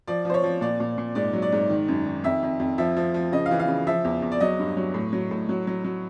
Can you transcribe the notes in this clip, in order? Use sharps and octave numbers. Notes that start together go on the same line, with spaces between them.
F3 D5
F3 C5
C#5
F3
A#2 D5
A#2
A#2
G#2 D5
F#3
D5
G#2
D#3
F#2
D#3
F2 E5
F2
F2
F3 E5
F3
F3
C#3 D#5
F5
E3
F5
C#3
F3 E5
E2
E2
D5
F#3 D#5
G2
F#3
A2
F#3
A2
F#3
F#3
F#3